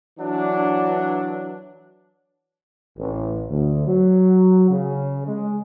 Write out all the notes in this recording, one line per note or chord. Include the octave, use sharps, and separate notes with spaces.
E3 F#3 D4
A1
D2
F#3
C#3
G#3